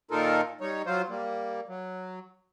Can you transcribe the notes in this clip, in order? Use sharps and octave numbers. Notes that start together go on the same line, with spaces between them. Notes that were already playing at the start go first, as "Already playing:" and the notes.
A#2 D#3 D#4 F4 A4 A#4
G3 D#4 C#5
F#3 F4 C5
G3 A#3
F#3